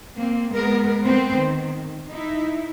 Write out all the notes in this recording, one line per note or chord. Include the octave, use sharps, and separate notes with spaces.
A#3 C4
G#3 B3 A#4
A3 B3 C4 C5
D#3
D#4 E4